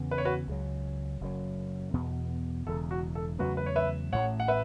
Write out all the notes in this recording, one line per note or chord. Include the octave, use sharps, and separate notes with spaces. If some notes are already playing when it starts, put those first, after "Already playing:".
Already playing: E2 C#3 E3 B3
B4
C#5
F#4 B4
C#2 C#3 F#3
F#1 F#2 F#3
E2 B2 B3
E1 E2 C#3 A4
F#4
A4
E2 C#3 F#3 A3 F#4 B4
B4
C#5
B4 E5
A1 A2 A3 C#5 F#5
F#5
B4 E5